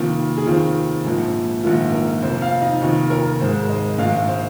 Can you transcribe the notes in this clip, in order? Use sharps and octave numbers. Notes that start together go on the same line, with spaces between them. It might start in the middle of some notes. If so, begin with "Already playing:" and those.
Already playing: F1 F2 D#3 A#3 F4
G#4
F1 D#2 D#3 C4 F4
A#1 G#2 F3 A#3
A#1 G#2 D#3 A#3 F4
A#4
F1 F2 F3 C4 C5
F5
D#4
F1 D#2 D#3 C4 F4
A#4
G#1 G#2 G#3 C5
C5
D#5
A#1 G#2 D#3 G#3 F5
C5